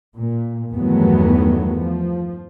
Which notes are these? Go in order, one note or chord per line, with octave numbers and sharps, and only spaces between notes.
A#2
E2 G2 D#3 F#3 A3 B3
F3